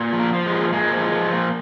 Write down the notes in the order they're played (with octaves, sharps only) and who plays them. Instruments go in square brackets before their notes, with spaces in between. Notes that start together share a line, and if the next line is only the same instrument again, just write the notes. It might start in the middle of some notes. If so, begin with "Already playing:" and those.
Already playing: [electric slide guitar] A#2
F3
A#3
F3
G#3
A#2
A#2 G#3
F3
F3
A#2